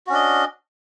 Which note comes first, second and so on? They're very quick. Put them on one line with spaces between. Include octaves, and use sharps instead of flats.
F#4 C#4 D4 D#5